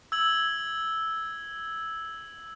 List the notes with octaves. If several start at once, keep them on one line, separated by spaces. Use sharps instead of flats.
E6 G#6 F#7